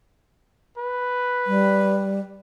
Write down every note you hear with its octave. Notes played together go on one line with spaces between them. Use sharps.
B4
G3